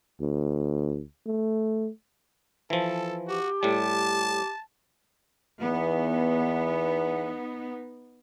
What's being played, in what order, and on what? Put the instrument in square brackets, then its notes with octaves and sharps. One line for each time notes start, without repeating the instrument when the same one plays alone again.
[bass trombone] D2
A3
[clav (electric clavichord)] E3 F3 [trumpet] A4
[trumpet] F#4 [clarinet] G4
[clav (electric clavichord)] A2 G3 [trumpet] A5
[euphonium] E2 [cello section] B3 D#4